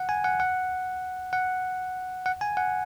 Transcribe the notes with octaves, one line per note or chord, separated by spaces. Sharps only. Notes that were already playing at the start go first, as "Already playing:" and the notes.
Already playing: F#5
G#5
F#5
F#5
F#5
F#5
G#5
F#5